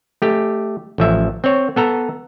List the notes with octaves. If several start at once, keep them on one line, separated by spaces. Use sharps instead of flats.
A3 G4
A1 F3 E5
C4 C#5
B3 A4 A#5